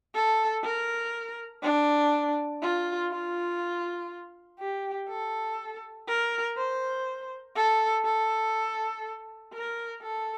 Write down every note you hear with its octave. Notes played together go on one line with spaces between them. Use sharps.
A4
A#4
D4
F4
F4
G4
A4
A#4
C5
A4
A4
A#4
A4